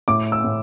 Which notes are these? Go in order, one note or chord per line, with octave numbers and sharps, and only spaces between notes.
A2 D6
E6
A2